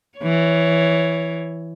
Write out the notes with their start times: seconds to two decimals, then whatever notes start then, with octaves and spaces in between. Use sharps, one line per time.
0.19 E3 C#5